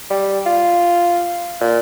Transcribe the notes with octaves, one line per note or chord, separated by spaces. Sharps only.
G3
F4
A#2